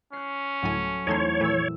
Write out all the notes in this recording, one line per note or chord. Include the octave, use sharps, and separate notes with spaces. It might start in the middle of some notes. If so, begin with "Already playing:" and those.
C#4 F#6 C7
D2 A2 F#3 A4 G#5
E2 A3 C4 D#4 A4 C#5 C6
F2 A#2 E3 A3 E6